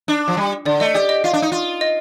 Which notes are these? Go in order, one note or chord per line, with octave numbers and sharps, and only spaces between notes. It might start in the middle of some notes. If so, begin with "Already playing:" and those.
D4
F3
G3
D3 D5
A3 D#5
G4 D5
D#5
F4 F5
D4
D#4
F4
D#5